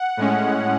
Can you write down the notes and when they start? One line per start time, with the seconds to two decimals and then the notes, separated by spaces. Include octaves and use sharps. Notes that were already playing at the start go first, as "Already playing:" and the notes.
Already playing: F#5
0.17 A2 G#3 C#4